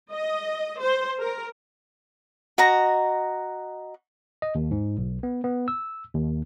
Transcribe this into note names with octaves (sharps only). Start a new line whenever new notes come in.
D#5
C5
A#4
F#4 D#5 A#5
D#5
D#2
G#2
B1
B3
B3
E6
D#2